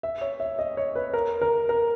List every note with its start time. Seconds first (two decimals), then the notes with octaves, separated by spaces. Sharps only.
0.03 E5
0.21 C#5
0.40 E5
0.59 D#5
0.77 C#5
0.95 B4
1.13 A#4
1.42 A#4
1.69 A#4